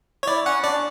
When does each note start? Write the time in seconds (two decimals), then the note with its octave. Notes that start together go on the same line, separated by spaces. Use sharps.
0.23 C#5
0.27 E4 D5
0.46 C#4 F#5
0.64 D4 D5